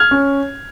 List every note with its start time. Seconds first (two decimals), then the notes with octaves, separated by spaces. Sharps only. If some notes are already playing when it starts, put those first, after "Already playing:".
Already playing: F6 G#6
0.11 C#4